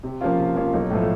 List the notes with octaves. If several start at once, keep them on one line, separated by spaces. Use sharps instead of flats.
C3
F3 A#3 C#4 F4
C3
F3 A#3 C#4 F4
B1
A2 F3 A3